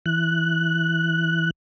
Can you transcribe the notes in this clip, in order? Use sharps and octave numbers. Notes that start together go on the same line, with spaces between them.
E3 F#6